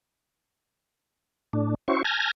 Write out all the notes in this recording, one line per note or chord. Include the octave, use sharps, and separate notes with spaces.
A2 D4
C#4 E4 F#4 C5 C#6
G#5 A5 F6 G6 G#6 A#6